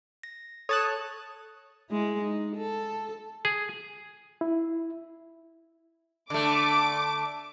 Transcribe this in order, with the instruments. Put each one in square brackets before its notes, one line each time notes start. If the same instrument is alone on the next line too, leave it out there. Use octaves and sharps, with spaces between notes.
[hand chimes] A#6
[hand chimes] A4 [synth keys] C#5 A5 F#6 [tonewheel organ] D#6
[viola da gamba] G#3 E4
D#4
A4
[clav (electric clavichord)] G#4
[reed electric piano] E4
[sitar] D3 A3 [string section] D6